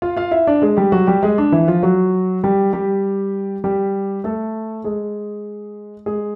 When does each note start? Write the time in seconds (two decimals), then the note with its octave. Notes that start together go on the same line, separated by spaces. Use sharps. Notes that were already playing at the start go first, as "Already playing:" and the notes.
0.02 F4 F5
0.16 F4 F5
0.31 E4 E5
0.47 D4 D5
0.62 G#3 G#4
0.77 G3 G4
0.92 F#3 F#4
1.07 G3 G4
1.23 G#3 G#4
1.38 D4
1.52 E3 E4
1.68 F3 F4
1.83 F#3 F#4
2.43 G3 G4
2.73 G3 G4
3.64 G3 G4
4.24 A3 A4
4.84 G#3 G#4
6.06 G#3 G#4